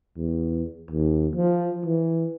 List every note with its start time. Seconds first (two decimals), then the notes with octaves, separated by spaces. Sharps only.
0.17 E2
0.90 D#2
1.35 F3
1.85 E3